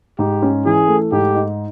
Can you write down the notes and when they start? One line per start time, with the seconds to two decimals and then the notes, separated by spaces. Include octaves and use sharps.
0.19 G#2 G4
0.42 C#4
0.65 E3 G#4
0.88 A3
1.12 G#2 G4
1.35 D#4